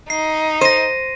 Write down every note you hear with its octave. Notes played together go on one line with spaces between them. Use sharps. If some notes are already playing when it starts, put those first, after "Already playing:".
D#4 C7
C5 A#6 D#7